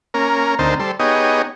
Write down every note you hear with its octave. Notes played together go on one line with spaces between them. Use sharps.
A#3 C#4 A#4
D2 C4 D#4 A#4 C5 A5
G3 A4 C5
B3 D#4 G4 G#4 C#5 D#5